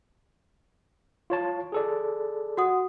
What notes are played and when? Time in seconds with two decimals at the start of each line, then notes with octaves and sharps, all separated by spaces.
1.30 F4 C#5 A5
1.72 G#4 A4 D5
2.57 F#4 F#5 D#6